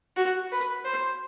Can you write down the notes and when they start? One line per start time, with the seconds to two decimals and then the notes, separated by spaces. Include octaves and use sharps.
0.17 F#4
0.51 B4
0.85 C5